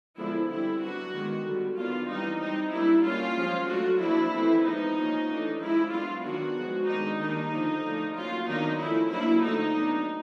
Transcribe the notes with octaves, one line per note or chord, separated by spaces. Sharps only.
D3 F3 G#3 B3 D4 E4
D3 G3 C4 E4
F#3 B3 D4 F#4
D#3 G#3 B3 D4
D3 G3 B3
D#3 F#3 B3 D4 F4
E3 G3 C4 D#4
G3 C4 D#4
G3 A#3 D4 E4
G3 A#3 C#4 F4
F3 G#3 C#4
F#3 A3 D4 F#4
F3 A#3 D4 E4
E3 A3 C4
F3 G#3 B3 D#4
F3 A#3 C#4
E3 A3 D4
F3 G#3 C#4 E4
F#3 B3 D4 F4
D#3 F#3 B3 D4 F#4
F3 G#3 B3
D#3 G#3 B3 D4 D#4
D#3 G3 A#3 D4 D#4
D3 F3 A#3 D4
F3 A3 D4
F#3 A#3 C#4 F4
D#3 F#3 B3 D4 D#4
F3 A3 C#4 E4
F#3 A#3 D4 E4
D3 F3 A3 D#4
F#3 B3 D4